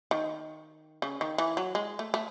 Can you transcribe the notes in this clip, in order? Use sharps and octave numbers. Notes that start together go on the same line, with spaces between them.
D#3
C#3
D#3
E3
F#3
G#3
A3
A3